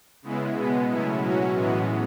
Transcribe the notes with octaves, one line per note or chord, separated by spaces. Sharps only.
C#3 G#3 B3 E4
B2 G#3 B3
A2 F#3 C#4 E4
F#3 C#4 F#4
A2 E3 G#3 B3